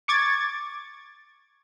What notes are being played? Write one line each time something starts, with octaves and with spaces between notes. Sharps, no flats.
C#6 D6 G#6 A6